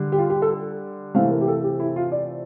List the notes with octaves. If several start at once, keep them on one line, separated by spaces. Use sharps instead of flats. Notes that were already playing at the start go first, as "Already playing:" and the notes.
Already playing: D3 G3
G4
F4
G4
A4
C3 E3 A3 C4 F5
A#4
G4
A4
G4
E4
F4
D5